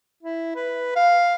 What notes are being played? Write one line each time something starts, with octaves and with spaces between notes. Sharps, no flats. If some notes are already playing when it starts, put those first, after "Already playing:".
E4
B4
F5